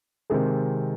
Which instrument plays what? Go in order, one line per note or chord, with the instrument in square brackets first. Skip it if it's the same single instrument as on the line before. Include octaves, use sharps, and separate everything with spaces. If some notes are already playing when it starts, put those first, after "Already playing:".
[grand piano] C3 D#3 G#3 C4